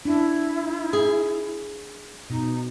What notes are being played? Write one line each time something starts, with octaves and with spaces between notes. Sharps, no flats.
D4 E4
G#4
B2 D#4